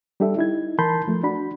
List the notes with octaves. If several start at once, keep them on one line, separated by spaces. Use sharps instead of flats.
G3 D4 G4 A4 E5
D#4 E4 G#6
E3 A#4 A5 B5 C6 G6
F3 A3
D4 F#4 B5